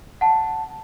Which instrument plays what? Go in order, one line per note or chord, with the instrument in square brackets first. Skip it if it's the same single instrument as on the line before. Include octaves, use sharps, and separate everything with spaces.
[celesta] F#5 A5